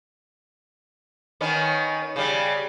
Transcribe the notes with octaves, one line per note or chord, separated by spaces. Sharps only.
D#3 B3 C#4
C#3 G3